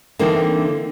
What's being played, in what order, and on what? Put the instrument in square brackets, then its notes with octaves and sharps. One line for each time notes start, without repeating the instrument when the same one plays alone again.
[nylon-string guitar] D3 E3 A#3 C4 D4 D#4